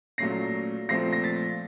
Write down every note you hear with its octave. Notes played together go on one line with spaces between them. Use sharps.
A#2 F#3 A3 C#4 A#6 C7
A#2 F3 A3 C4 A#6 C7
A#6
A6 B6